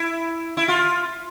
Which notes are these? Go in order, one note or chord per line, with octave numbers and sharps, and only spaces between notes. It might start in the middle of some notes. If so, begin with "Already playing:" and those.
Already playing: E4
E4
F4